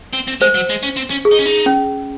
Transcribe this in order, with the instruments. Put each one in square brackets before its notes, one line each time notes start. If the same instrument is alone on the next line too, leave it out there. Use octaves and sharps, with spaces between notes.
[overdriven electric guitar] C4
C4
[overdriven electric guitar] G#3 [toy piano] C5
[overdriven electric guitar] F#3
G#3
C#4
C4
C#4
[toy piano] G#4
[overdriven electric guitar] D#4
C#4
D#4
[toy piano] C#4